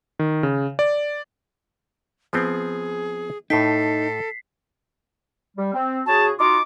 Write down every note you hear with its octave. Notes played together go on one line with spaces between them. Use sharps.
D#3
C#3
D5
F3 B3 C4 G#4
A2 D#4 A4 G5 B6 C7
G3
C4
C#3 F#4 G#4 A5
D#4 F4 F#4 D6